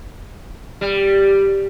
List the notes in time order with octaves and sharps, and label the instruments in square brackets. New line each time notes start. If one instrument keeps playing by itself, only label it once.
[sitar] G3